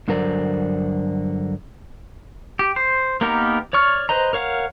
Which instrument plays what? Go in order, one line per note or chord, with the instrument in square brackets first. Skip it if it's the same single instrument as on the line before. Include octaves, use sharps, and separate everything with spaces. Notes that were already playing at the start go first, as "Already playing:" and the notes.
[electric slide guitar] G2 D3 F#3 A#4 C5 D5
[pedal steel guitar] G4
C5
A#3 B3 D#4 G4 A#4
C#5 D5 C#6 F6
B4 C5 D#5 A#5
A#4 C#5 F5 F#5